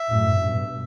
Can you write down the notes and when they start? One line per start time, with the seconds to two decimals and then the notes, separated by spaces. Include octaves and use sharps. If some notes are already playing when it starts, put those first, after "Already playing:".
Already playing: E5
0.10 F#2 A2
0.38 G2 B2